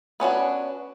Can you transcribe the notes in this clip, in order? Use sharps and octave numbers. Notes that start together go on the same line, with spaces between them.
B3 C#4 D4 F#4